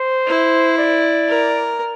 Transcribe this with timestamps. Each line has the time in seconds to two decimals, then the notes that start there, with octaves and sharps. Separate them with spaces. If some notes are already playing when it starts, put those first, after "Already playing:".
Already playing: C5
0.27 E4
0.78 D5
1.28 A#4